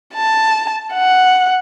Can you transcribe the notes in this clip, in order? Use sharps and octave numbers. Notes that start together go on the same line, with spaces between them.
A5
F#5